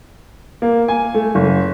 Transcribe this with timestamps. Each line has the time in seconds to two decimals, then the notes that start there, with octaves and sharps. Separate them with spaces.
0.62 A#3
0.88 G#5
1.14 A3
1.35 F#1